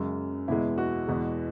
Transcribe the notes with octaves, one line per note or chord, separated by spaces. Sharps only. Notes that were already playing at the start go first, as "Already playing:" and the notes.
Already playing: F#2 C#3 G#3
E2 B2 G#3 E4
F#4
E2 B2 G#3